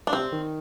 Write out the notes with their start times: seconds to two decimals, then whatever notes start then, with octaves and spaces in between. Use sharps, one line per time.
0.07 D4
0.13 C3 C4
0.32 D#3